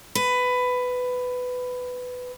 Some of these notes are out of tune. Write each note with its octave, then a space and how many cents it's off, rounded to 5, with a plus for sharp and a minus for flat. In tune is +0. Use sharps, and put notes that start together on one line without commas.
B4 +15